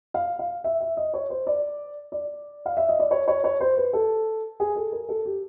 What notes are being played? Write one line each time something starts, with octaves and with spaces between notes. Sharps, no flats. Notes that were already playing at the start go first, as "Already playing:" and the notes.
F5
F5
E5
E5
D#5
C#5
C5
D5
D5
F5
E5
D#5
D5
C#5
C#5
C#5
C5
B4
A4
G#4
A4
A#4
A4
G4